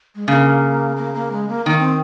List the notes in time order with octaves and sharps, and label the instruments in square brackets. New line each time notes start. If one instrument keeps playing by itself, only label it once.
[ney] G#3
[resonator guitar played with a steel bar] C#3 [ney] A#3
[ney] A#3
A#3
G#3
A#3
[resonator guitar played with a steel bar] D#3 [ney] A#3
[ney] C4